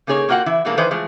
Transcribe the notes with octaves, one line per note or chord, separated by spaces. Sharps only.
C#3 A#3 D#4 G#4 C#5
A#3 F4 F#4 D#5 F#5 G5
E3 E4
B2 E3 G#3 A#3 D4
D#3 E3 B4 C5 D#5
E3 F3 G#3 A3